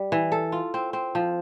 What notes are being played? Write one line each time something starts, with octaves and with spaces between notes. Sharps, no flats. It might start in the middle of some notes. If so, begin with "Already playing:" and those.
Already playing: G3
E3
A4
F4
C4
C4
F3